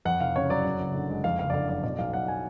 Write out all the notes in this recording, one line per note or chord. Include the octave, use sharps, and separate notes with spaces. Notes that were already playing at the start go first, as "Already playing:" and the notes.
F2 F#5
F1 F5
C#3 C#5
F#3 D5
F#2
F#1
D3
G#3
F2 F5
F#1 F5
D5
D3 F5
F#3 D5
B2 D5
B1 F5
F#3 F#5
G#5